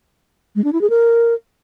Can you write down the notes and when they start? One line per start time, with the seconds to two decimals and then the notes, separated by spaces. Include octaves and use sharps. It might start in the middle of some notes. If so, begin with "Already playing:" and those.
0.56 G#3
0.64 D4
0.73 E4
0.81 G#4
0.90 A#4